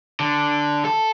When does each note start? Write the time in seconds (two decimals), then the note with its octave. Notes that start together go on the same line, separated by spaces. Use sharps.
0.20 D3
0.85 A4